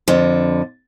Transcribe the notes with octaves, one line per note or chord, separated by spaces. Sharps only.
F2 D3